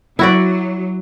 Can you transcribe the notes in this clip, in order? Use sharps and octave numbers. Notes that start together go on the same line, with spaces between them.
F#3 E4 F#4 D5